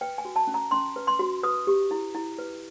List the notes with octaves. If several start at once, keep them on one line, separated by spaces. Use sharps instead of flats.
B4 G5
G#5
F#4
A5
C#4
A#5
C#4 C6
B4
C6
F#4
B4 D#6
G4
E4
E4
B4